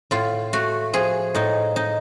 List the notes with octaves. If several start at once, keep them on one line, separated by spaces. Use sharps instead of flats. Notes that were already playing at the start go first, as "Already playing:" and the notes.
A2 F4
A3 F#4
F3 G#4
A2 D#4
D#4